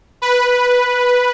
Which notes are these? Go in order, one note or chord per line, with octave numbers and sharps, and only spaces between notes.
B4